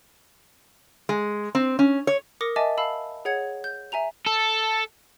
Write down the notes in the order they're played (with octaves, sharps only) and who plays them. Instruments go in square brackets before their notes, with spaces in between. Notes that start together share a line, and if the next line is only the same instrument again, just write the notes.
[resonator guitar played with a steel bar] G#3
C4
C#4
C#5
[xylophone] A#4 D6 D#6 A#6 C#7
D#5 E5 G#5 A5 D6 A6
F5 A5 B5 E6
G#4 C#5 F#5 G#6 C#7
G6
E5 G#5 A#5 F7
[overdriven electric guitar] A4